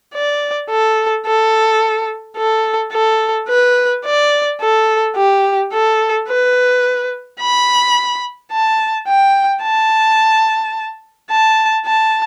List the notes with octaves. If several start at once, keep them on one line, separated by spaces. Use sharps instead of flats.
D5
A4
A4
A4
A4
B4
D5
A4
G4
A4
B4
B5
A5
G5
A5
A5
A5